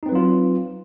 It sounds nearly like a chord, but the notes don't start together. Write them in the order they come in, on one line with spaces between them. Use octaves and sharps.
D#4 C4 B4 F#3 F4